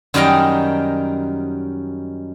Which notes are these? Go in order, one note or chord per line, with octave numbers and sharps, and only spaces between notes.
F#2 D#3 G3 A#4 G5 A#5